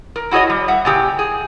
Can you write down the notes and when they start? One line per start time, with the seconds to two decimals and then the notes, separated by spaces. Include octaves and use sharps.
0.16 A#4
0.31 E4 F#4 G#4 C#5 D#5
0.50 G3
0.68 E5 F#5
0.85 A#2 C#3 G4
1.19 G#4